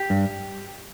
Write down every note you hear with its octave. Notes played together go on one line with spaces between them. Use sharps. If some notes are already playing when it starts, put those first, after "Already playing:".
Already playing: G4
G2